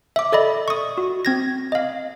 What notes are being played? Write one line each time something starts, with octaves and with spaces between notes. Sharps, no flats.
E5 D6
A4 D5 D#5 B5
C#6 D#6
F#4
C4 G#6 A#6
D#5 F5